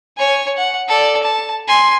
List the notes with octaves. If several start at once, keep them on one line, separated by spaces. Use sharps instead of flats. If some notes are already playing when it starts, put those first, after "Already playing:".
C#5 G#5
F#5
A4 D5
A5
G#5 C6